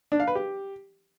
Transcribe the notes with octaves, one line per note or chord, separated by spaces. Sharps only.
D4
F5
B4
G4